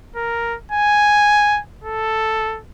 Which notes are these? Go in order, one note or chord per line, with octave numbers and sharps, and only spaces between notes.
A#4
G#5
A4